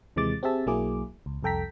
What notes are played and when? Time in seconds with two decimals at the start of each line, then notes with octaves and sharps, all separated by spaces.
0.16 D#2 C3 E3 G#3 D6 A6
0.43 C4 G4 G#4 E5 A5
0.66 B1 F#3 A#3 E4 G#4 D6
1.26 C#2
1.43 C2 F2 A4 G5 A#5 B6